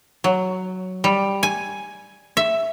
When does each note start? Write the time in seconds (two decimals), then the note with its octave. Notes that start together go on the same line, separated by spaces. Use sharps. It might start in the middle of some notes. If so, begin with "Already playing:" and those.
0.24 F#3
1.04 G3
1.43 G#5
2.37 E5